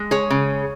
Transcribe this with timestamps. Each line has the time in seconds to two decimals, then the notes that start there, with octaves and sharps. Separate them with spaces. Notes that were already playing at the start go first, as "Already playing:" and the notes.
Already playing: G#3
0.11 G#4 C#5
0.30 C#3